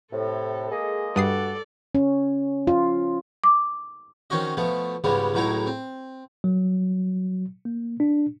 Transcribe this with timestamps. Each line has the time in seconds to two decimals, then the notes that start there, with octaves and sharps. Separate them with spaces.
0.12 A2 C3 A4
0.71 G#3 A#3 G#4 D#5
1.16 G2 F#4 A4 D5 D#6 C7
1.95 C#4
2.67 F4
3.44 D6
4.30 D#3 C4 C#4 F#4 D#5
4.57 B2 F3 A3 B3
5.04 C#2 G#2 C#3 G3 G#3 B3
5.34 C#2 A2 F#3 D#4 E4 A#5
5.67 C4
6.44 F#3
7.65 A#3
8.00 D4